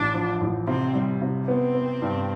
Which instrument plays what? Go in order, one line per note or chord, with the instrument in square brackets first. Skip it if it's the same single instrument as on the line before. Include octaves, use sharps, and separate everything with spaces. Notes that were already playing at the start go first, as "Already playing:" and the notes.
Already playing: [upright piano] A1 [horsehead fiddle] D4
[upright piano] F3
A1
[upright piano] C3 [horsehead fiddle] C4
[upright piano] G3
C3
[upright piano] B3 [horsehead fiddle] C4
[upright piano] B3
G2